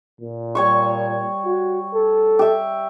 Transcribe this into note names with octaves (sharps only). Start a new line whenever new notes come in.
A#2
G3 C#5 C#6
F#4
A4
G4 E5